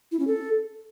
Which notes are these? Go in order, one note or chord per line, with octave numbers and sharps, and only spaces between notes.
E4
C#4
A4